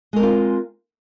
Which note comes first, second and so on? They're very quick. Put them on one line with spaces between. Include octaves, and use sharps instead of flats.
G#3 A#4 C4 F4